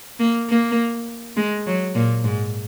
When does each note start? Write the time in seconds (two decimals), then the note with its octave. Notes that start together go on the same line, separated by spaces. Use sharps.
0.20 A#3
0.49 A#3
1.37 G#3
1.67 F#3
1.95 A#2
2.24 G#2